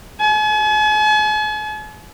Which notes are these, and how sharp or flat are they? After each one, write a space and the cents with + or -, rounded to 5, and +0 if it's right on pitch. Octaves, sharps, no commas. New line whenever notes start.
G#5 +45